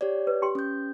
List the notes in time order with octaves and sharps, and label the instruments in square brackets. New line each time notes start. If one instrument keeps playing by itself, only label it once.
[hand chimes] G4 C#5 D5
[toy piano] B4
G4 G5 C6
[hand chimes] C#4 G6